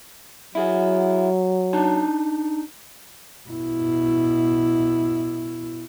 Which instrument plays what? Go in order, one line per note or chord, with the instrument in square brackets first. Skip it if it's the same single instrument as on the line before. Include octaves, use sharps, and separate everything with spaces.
[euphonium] F#3 [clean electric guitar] E4 G#4
[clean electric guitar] D4 D#4 A5
[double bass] B2 E4